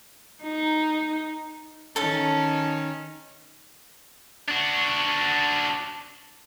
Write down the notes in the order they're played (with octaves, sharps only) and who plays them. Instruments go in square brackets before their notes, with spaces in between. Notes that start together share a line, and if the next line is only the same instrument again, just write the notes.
[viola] D#4
[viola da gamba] D#3 C#4 [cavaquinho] A4 A5
[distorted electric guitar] D4 F#4